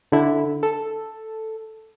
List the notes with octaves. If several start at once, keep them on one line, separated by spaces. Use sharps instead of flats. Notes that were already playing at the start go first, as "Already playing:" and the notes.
D3 E4
A4